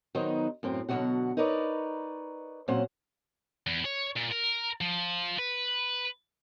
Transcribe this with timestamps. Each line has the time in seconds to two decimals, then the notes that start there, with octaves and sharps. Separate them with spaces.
0.15 D#3 F#3 B3 D#4 C5
0.63 F#2 A2 C4
0.89 B2 D3 F3 F#3 F#4 F#5
1.37 D#4 A#4 B4 C#5 D5
2.68 A#2 F#3 C4 C#4 C5 F#5
3.67 E2
3.85 C#5
4.16 A#2
4.32 A#4
4.81 F3
5.39 B4